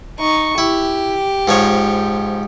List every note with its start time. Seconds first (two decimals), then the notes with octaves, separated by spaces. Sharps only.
0.19 D#4 C#6
0.58 E4 G4
1.48 G#2 F3 C#5